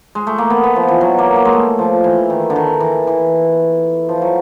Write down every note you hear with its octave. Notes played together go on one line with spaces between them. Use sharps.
G#3
A3
A#3
B3
B3
F3
E3
F#3
A#3
A#3
G#3
A3
F3
E3
D#3
D3
D#3
E3
E3
F3
F#3